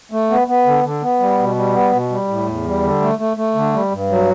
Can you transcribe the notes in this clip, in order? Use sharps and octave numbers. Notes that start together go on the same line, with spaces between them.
A3
B3
B3
D3
D3
B3
G3
B2
G3
B3
B2
G3
A2
E2
G3
D3
A3
A3
A3
D3
G3
G2
F#3